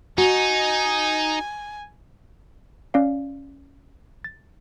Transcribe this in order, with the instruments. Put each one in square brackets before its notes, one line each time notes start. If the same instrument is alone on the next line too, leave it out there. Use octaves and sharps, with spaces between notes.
[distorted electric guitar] D#4 [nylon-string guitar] F#4 [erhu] G#5
[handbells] C#4 D5 F5
A6